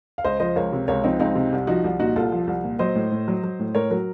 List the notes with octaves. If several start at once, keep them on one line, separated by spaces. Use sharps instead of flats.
F5
C#2 C5 D#5
F3 C5 D#5
C#2 A#4 C#5
C3
C#2 A#4 C#5
F3 C4 D#4
C#2 C4 D#4
C3
C2
F3 D#4 F#4
C2
A#2 D#4 F#4
C2 F4 A4
F3
C2
A#2
F#3 C5 D#5
A2
A2
F#3
F#3
A2
A2 A#4 C#5
F#3 F#4 A#4